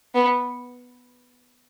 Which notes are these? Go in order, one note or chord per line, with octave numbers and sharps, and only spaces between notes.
B3